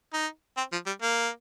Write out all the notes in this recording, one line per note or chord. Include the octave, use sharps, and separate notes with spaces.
D#4
C4
F3
G3
A#3